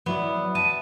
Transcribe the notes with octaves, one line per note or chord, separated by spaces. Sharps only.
F#3 B3 E4 D5
E5 A5 D#7